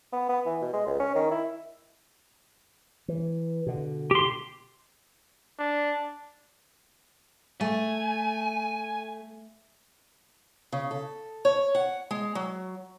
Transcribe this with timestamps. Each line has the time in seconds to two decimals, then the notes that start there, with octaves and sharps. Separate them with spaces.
0.13 B3
0.29 B3
0.46 E3
0.62 B2
0.73 G#3
0.87 C#2
1.00 C#4
1.15 D#3
1.31 E4
3.08 E3
3.66 B2 D3
4.11 G4 C6
5.59 D4
7.61 A3 G#5
10.72 C#3
10.91 A4
11.45 C#5
11.75 F#5
12.11 G#3
12.35 F#3